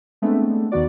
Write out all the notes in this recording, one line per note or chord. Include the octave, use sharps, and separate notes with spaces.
G#3 A3 B3 C4 D4
D#2 D#3 B3 F#4 D5